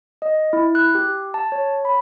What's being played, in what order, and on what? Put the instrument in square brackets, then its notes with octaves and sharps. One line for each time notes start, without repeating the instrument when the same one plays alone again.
[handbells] D#5
E4
F#6
G4
A5
C#5
B5